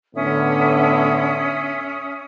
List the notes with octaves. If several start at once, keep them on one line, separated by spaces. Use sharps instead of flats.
A2 D3 B3 C#4 E5 D#6